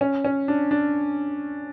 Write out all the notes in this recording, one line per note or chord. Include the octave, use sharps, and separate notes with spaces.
C#4
C#4
D4
D4